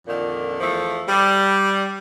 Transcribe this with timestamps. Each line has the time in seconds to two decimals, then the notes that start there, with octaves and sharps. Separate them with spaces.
0.07 F2 A#2 D3 D#3
0.60 E2 F3 A3
1.08 G3